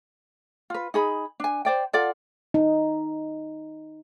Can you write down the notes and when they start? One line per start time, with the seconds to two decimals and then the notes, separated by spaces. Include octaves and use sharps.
0.70 F4 B4
0.94 D#4 G#4 B5
1.40 D4 G#5
1.65 C5 D5 G5
1.93 F4 A4 D5 F#5
2.54 D#4